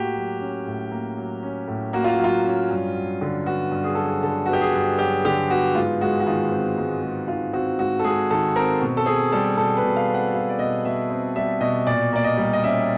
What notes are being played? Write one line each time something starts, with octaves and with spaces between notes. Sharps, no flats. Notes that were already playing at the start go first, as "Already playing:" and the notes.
Already playing: A2 A#3 F#4 G4
F#3
C#4
A2
A#3
F#3
C#4
A2
A#3 F#4
F4
F#3
F4
C#4
G2
F#3
D3
B3 F#4
G2
G#4
F#3 A4
G#4
D3 A4
F#4
B3 G4
G#4
G2
F#3 G4
D3 G4
B3 F#4
G#2 F4
G#3 F#4
F#4
D#3 F4
C4
G#2
G#3
D#3 F4
C4 F#4
G#2 F#4
A4
G#3 G#4
D#3 A4
C4 A#4
B2
A4
C4 G#4
G3 A4
B2 A4
B4
B2
F5
C4
F#5
G3 F5
D5
B2 D#5
B2 E5
C4
G3 E5
B2 D#5
A#2 D5
A#3 D5
D#5
G3
D#5
C#4 E5